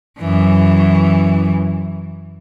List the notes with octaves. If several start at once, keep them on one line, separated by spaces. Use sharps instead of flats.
F#2 E3